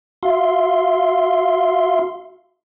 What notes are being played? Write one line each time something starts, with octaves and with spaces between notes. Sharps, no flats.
F#4 E5 F5 C6